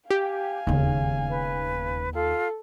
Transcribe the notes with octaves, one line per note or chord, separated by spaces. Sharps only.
G4 F5 G#5
E1 D#2 C#3
B4
F4 A4